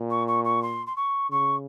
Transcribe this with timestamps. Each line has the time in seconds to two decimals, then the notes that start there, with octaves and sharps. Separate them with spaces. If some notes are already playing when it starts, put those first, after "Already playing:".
Already playing: A#2
0.10 C#6
0.27 C#6
0.44 C#6
0.62 C6
0.86 C6
0.96 C#6
1.31 C#3 C#6